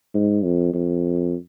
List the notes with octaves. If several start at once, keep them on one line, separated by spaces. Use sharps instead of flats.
G#2
F2
F2